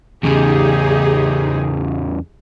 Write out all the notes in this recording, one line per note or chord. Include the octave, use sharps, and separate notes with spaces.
E2 C#3 D#4 G4 G#4